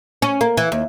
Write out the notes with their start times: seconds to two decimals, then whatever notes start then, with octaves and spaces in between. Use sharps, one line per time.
0.22 C#4
0.41 A#3
0.57 E3
0.72 D#2